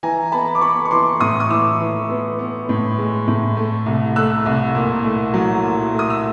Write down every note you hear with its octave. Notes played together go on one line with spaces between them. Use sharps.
E3 G#5 A#5
B3 A5 B5
D6
B3 B5 C#6
C#6
E3 C6 D6
A2 C#6 D#6
D#6
E3 D6 E6
E3
B3
B3
A2
G#3
A2
A3
C2
A3 E6 F#6
C2
A#2
A3
F#3
A#2
A3
D#6
E6